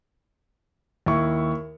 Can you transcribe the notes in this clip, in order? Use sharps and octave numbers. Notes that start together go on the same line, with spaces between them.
D#2 E4 C#6